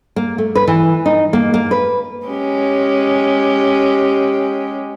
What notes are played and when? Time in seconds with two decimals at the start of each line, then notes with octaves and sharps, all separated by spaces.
0.16 A#3
0.38 A3
0.55 B4
0.68 E3
1.06 D#4
1.33 A#3
1.54 A#3
1.71 B4
2.26 G#3 C#4 G4